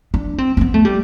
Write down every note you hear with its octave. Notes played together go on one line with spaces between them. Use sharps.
D4
C4
C4
B3
A3
G3